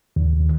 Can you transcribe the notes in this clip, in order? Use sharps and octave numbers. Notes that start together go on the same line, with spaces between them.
D#2